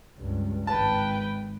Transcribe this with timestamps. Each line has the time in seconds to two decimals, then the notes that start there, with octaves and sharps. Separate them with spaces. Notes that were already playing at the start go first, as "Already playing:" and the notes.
0.18 C#2 G2
0.67 G#1 B4 G5 A5